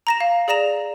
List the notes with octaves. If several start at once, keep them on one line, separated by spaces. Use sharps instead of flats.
A#5 A#6 E7
F5
G#4 D5 A#5 A#6 E7 F7